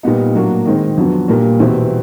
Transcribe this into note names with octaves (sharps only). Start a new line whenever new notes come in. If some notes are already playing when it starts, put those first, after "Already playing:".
A#2 G3 B3 D#4
A2 F#3 A#3 D4 F#4
D#3 G#3 C4
F2 D3 F#3 B3
A#2 G3 A#3 D4
E2 B2 G3 C4 E4